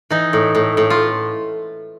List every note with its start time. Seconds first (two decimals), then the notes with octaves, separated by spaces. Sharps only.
0.10 E3 D#4
0.33 A2
0.55 A2
0.77 A2
0.90 F4